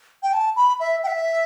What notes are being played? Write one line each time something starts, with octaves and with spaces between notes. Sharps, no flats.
G5
A5
B5
E5
G5
E5